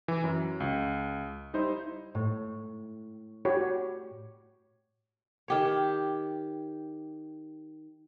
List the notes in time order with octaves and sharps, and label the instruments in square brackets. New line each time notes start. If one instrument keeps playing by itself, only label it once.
[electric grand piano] E3
F#2
C#2
G3 D#4 E4 C5
[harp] A2
[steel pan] F#4 G4 C#5
[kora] D#3 G4 C#5